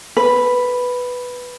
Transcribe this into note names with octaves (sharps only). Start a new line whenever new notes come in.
B4